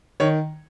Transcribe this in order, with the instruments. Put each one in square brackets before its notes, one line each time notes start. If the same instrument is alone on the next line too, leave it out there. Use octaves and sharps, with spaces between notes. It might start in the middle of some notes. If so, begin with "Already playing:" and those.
[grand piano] D#3 C#5